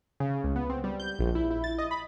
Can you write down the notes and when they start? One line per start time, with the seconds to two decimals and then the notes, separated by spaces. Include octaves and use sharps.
0.20 C#3
0.44 C#2
0.56 B3
0.70 C4
0.84 G3
1.00 G6
1.19 A#1
1.35 E4
1.51 E4
1.64 A6
1.78 D#5
1.91 B5